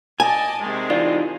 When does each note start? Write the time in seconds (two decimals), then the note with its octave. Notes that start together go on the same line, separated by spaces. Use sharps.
0.20 D5 D#5 G#5 A5
0.61 C3 D#3 G#3
0.90 E3 D#4 F4 D5